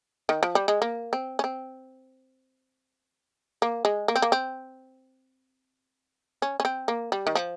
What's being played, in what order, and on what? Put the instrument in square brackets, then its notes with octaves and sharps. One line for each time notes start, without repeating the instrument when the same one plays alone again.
[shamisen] D#3
F3
G3
G#3
A#3
C4
C#4
C4
A#3
G#3
A#3
C4
A#3
C4
C#4
C#4
C4
A#3
G3
D#3
F3